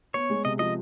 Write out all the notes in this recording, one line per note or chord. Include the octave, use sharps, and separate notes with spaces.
B3 C#5
G#3
C3 D#5
F3 D#5